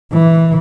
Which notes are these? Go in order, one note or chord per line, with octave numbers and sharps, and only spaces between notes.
E3